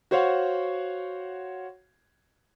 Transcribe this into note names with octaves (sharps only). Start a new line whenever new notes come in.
F#4 C5 C#5 F5 F#5